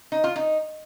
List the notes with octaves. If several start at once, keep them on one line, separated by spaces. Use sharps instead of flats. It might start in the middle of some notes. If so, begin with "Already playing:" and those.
D#4
F4
D#4